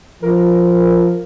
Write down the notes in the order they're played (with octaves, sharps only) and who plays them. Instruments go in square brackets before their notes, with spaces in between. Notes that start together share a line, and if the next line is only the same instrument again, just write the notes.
[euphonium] F3 [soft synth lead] A#4